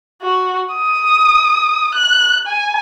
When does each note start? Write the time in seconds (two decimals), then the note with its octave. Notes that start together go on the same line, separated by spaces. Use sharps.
0.22 F#4
0.73 D#6
1.95 F#6
2.47 G#5